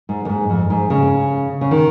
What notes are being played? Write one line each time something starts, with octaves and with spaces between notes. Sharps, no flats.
G#2
F2
G#2
F2
G#2
C#3
C#3
D#3